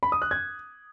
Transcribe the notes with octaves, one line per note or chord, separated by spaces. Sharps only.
B5
D#6
F#6
G#6